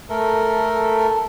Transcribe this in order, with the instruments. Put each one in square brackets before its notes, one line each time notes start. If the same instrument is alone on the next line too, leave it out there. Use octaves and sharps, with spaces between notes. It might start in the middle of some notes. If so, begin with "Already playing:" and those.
[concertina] A3 A4 A#4